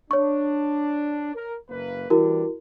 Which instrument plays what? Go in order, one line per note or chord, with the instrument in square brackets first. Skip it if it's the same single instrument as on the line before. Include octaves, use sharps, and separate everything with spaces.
[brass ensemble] D4 [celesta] C#5 C#6
[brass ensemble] A#4
F#1 A#3 B4
[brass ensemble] E3 G3 D4 [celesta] E4 F#4 A#4